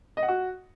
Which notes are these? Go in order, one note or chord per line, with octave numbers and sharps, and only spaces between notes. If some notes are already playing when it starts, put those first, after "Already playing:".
D#5
F#5
F#4